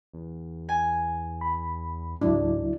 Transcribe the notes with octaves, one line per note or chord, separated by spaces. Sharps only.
E2
G#5
B5
C#2 G#2 F#3 D4 E4